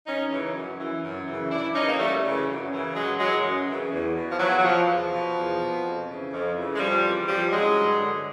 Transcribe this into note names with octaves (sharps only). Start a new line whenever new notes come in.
F#2 C#4 D#4
C#3 E3
F#2
C#3 E3
F#2
C#3 E3
F#2 D4 E4
C#3 E3 C#4 D#4
A#3
F#2 G3 A3
C#3 E3
F#2
C#3 E3
F#2 F#3 G#3
C#3 E3 F#3 G#3
F#2
C#3 E3
E2
B2
F3
E2 E3 F#3
F#3
B2 F3
E2 F3
B2
E2
B2
F2
C#3 E3
F2
C#3 E3
G#3
F2 F3 G3
C#3 E3
F2 F3 G3
C#3 E3 F#3 G#3
G2
D3